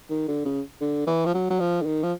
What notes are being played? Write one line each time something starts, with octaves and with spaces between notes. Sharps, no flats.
D#3
D3
C#3
D3
E3
F3
F#3
F#3
F3
D3
D#3
F3